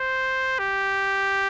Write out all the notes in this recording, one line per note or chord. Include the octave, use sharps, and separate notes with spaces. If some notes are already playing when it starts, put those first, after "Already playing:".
Already playing: C5
G4